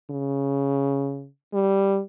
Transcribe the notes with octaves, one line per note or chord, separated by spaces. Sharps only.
C#3
G3